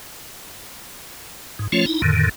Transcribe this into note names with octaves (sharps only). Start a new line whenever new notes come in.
G#2
F3 A3 C#4 F4 C#5
D#4 E4
F2 A2 D3 D#3